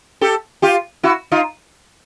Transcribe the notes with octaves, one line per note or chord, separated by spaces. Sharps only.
G4 A4
F4 G4
E4 F#4
D#4 F4